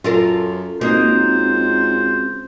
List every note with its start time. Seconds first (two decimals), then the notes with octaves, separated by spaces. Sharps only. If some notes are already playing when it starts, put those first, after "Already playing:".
0.04 F#2 F4 A4 A#4
0.81 C#2 A#3 C4 D#4 F#4 C5